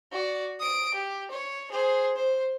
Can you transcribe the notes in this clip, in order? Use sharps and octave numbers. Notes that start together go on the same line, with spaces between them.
F#4 D5
D#6 D7
G4
C#5
G#4 C5
C5